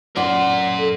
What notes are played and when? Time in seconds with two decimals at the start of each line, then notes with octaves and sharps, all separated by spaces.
0.16 F#2 A#4 D5 F#5 C6
0.78 A4